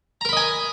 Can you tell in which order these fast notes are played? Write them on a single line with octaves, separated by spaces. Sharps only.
A#5 A#4 B5 D#5 G#5